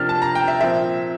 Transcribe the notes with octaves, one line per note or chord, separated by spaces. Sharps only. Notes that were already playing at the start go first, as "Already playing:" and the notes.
Already playing: C3 F3 A#3 D4 F6 A6
A5
A#5
G5
E5
A#2 F3 C4 E5